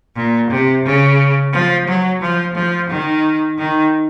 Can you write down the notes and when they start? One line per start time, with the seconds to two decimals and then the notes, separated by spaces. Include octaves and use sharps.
0.16 A#2
0.50 C3
0.85 C#3
1.52 F3
1.87 F#3
2.21 F3
2.55 F3
2.90 D#3
3.58 D#3